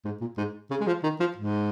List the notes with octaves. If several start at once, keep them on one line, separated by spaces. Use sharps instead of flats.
G#2
A#2
G#2
C#3
G#3
F3
D#3
F3
G#2